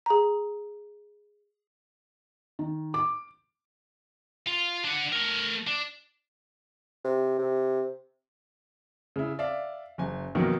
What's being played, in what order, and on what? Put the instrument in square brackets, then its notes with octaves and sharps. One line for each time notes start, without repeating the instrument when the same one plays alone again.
[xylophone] G#4 A#5
[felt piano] D#3
D6
[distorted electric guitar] F4
D4 F#5
A3 A#4
D4
[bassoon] C3
C3
[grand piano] C#3 E4
D5 E5 F5
F#1 G#5
B1 F2 B2 D#3 A#3